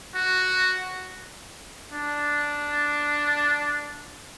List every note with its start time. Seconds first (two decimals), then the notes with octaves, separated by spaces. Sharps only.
0.15 F#4
1.92 D4